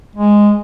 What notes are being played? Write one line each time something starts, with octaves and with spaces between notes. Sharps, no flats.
G#3